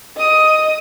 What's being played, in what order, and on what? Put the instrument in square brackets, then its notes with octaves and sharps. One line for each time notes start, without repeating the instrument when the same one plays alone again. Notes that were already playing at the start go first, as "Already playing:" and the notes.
[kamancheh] D#5 D#6